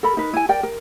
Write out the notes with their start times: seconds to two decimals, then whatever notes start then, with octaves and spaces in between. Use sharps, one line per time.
0.03 A4 A#4 B5
0.17 D#4 A#4 B4
0.34 E4 G#5
0.49 A#4 D5 G5
0.63 A#4